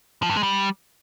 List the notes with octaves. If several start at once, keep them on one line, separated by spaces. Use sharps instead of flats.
F3
G2
G#3
G3